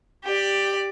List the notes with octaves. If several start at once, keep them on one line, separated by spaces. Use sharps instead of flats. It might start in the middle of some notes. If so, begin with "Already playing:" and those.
G4 D5